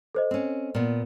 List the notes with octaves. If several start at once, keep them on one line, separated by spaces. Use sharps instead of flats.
A4 C5 D#5
C4 C#4
A#2 B3